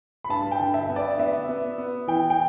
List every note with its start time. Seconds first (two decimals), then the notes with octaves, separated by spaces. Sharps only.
0.24 B5
0.29 G2 A5
0.51 G5
0.60 D3
0.74 E5
0.89 B3
0.96 D5
1.18 B3 E5
1.49 B3
1.78 B3
2.08 E3 G5
2.30 G5